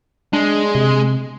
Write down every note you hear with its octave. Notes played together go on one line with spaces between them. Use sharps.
G#3 D4
C3